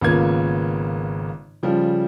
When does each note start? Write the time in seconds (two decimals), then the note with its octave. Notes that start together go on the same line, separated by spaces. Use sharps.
0.01 G#1 C#3 A#3 B3 F4 G#6
1.63 C#3 F3 G3